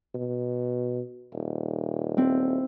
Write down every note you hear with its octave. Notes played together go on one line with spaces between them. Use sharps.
B2
D#1
C4 E4